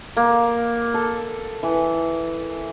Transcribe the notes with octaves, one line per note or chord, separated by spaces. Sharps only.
A#3
A4
E3